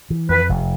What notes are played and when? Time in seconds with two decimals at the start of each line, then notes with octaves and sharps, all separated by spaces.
0.10 E3
0.29 F2 B4
0.49 F1